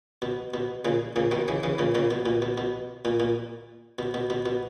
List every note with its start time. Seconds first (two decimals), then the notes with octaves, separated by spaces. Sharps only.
0.22 B2
0.54 B2
0.85 A#2 C#3
1.16 A#2 C#3
1.31 B2 D#3
1.48 C#3 E3
1.63 C#3 E3
1.78 A#2 C#3
1.95 A#2 C#3
2.11 B2
2.26 A#2
2.42 B2
2.58 B2
3.05 A#2
3.20 A#2
3.99 B2
4.14 B2
4.30 B2
4.46 B2